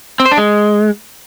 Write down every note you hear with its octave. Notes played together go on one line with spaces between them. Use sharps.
C4
C5
D4
G#3